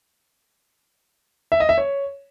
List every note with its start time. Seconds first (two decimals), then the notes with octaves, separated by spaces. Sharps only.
1.52 E5
1.60 D#5
1.69 E5
1.78 C#5